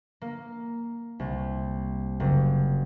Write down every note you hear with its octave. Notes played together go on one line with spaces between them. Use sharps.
A#3
C2
F#1